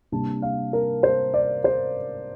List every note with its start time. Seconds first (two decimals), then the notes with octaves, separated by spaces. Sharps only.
0.12 C3 G3 A#3 D4 A5
0.42 F5
0.73 A#4
1.03 C5
1.34 D5
1.64 C5